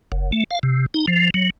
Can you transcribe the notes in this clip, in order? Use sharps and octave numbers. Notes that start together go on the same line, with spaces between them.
F#1
A3
F5
C3
D#4
F3
F#3